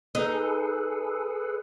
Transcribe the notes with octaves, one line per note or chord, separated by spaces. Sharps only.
D#4 G#4 A4 B4